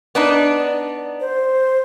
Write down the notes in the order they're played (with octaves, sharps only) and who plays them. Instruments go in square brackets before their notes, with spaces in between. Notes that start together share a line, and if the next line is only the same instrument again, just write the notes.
[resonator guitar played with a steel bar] B3 D4 D#4
[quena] D5
C5